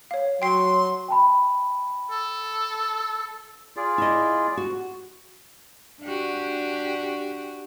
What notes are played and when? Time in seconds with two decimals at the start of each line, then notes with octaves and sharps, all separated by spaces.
0.11 C#5 F5
0.42 F#3 G5 C6 C7
1.08 G5 A5 B5
2.11 A4
3.77 F4 G#4 D5
3.98 E4 D#5
4.57 F#4
6.02 D4 F#4 G4